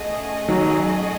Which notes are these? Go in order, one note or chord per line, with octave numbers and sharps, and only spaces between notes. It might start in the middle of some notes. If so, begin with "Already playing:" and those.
Already playing: A3 C#4 G#4 D#5 F#5
D#3 F#3